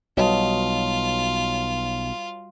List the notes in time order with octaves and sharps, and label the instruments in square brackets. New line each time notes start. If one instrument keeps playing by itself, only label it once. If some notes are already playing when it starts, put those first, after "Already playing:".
[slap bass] B1 [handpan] G3 F#4 D#5 [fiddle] F4 [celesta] B4 C#5 A5